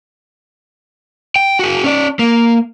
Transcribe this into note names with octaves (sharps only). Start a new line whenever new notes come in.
G5
F#4 G#4
C#4 D5
A#3